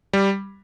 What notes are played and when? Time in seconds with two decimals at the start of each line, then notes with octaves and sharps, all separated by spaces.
0.13 G3